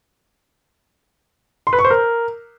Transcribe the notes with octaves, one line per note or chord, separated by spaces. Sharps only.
C6
B4
C#6
C5
A#4